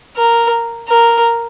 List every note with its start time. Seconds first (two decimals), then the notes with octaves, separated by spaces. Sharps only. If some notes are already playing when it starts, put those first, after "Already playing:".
0.17 A#4
0.88 A#4